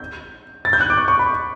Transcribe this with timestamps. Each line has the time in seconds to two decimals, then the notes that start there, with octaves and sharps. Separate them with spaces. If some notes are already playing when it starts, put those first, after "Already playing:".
Already playing: G6
0.65 A6
0.73 G6
0.81 F#6
0.90 D6
0.98 C#6
1.08 C#6
1.19 B5